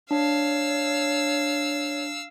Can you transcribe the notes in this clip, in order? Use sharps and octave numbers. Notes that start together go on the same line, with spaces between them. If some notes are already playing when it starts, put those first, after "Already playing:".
D4 C#5 F5 E6